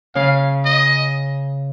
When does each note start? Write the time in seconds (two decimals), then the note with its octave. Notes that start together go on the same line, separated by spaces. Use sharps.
0.15 C#3 C#4 F5
0.65 D#5